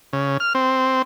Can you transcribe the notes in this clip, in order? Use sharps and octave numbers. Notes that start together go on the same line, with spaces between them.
C#3
F6
C4